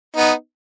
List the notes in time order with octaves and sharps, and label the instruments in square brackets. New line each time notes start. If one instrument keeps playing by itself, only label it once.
[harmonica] B3 D#4